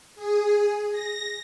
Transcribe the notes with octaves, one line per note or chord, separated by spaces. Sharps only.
G#4
A#6